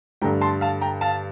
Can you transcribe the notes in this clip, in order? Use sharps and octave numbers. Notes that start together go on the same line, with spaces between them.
G2 D3 A3 G5 A#5
A5 C6
F5 A5
G5 A#5
F5 A5